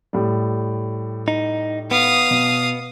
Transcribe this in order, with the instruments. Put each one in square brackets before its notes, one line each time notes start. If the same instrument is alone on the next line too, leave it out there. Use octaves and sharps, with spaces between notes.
[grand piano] A2 G3
[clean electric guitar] D#4
[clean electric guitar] B3 [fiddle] F5 D#6
[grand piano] B2